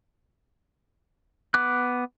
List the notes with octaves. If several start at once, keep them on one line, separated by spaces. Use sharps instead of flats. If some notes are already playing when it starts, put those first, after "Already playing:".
B3 D6 F#6